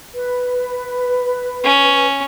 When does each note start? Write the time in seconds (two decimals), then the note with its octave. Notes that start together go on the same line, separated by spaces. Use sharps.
0.13 B4
1.64 C#4